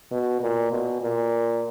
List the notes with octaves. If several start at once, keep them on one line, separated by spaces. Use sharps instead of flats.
B2
A#2
B2
A#2